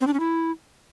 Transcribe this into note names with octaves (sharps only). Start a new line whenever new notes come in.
C4
D4
C#4
E4